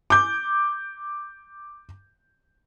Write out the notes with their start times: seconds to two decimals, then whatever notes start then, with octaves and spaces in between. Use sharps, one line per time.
0.10 D6 G6